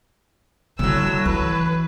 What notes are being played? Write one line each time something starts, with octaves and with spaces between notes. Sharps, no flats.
A2 D3 F#3 G3 E6
E3 B4